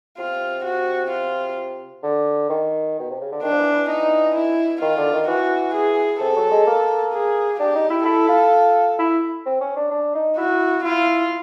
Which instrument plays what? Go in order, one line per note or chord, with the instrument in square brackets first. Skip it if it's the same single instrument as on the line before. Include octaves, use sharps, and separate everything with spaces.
[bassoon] C3 [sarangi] F4
[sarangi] F#4
F4
[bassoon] D3
D#3
B2
C3
C#3
D3
[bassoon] D#3 [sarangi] D4
[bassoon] F3
E3
E3
[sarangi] D#4
E4
[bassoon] D#3 [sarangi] F4
[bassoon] D3
D#3
[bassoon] E3 [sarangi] F#4
[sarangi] G#4
[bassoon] C3 [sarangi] A4
[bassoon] F#3
G#3
A#3
[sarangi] G#4
[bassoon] D4 [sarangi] G4
[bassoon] D#4
E4
[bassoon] E4 [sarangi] A4
[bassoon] F4
E4
C4
C#4
D4
D4
D#4
[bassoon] E4 [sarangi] F#4
[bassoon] E4 [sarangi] F4